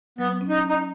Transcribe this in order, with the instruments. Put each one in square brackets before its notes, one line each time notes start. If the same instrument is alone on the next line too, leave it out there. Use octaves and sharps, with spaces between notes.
[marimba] F#3 [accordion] B3
[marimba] C#4
[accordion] D#4
[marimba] C#4
[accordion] D#4